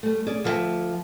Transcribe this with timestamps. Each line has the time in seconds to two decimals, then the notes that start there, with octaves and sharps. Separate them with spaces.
0.03 G3 A3
0.27 C#4 G#4 D5
0.44 D2 F3 A4 C5 E5 G5